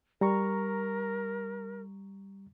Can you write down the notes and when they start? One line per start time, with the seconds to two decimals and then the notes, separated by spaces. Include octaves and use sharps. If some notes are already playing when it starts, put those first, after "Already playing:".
0.21 G3 A#4 A#5 C#6